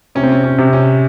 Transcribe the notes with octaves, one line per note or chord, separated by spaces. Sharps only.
C3 C#4
C4
C#4
C#4
C3
C#4